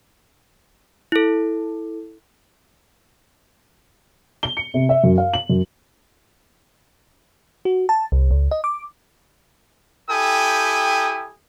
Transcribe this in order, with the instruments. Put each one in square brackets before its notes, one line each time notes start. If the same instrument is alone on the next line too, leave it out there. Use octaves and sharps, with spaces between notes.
[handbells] E4 A4
[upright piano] G7
C#7
C3
E5
F#2
F5
F#7
F#2
[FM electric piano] F#4
A5
C2
C#2
D#5
D6
[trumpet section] E4 G4 A4 G5 G#5 D#6